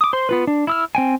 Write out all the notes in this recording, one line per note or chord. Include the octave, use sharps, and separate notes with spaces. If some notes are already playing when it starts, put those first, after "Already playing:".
D6 D#6
C5 C6
B3 F4 B4
D4
E4 E6 F6
C4 G5 G#5